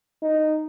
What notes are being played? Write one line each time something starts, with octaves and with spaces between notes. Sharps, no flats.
D#4